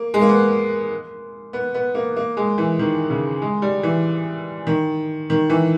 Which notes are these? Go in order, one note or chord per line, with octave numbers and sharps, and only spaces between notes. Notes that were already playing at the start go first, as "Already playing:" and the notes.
Already playing: A#3
G#3
A#3
B3
B3
B3
A#3
A#3
G#3
E3
D#3
C#3
G#3
G3
E3
D#3
D#3
E3